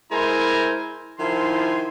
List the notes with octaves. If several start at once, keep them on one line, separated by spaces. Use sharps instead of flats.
G#3 E4 A#4 C5 G#5 A#5
D#3 F3 E4 G#5 C6